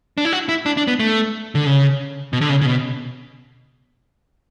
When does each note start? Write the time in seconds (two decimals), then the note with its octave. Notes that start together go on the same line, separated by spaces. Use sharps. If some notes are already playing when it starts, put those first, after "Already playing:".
0.18 D4
0.25 E4
0.33 F#4
0.49 E4
0.66 D4
0.77 D4
0.88 B3
0.99 A3
1.55 D3
1.66 C#3
2.33 B2
2.41 D3
2.50 C#3
2.61 C#3
2.66 B2